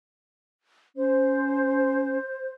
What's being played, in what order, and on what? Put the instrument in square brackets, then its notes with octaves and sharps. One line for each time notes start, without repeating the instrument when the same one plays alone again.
[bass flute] C#4 [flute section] C5